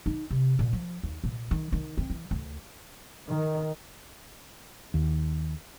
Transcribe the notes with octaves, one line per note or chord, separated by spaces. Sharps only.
D#4
C3
A#2
F3
D#2
A#2
D#3
D#3
C4
E3
D2
D#3
D#2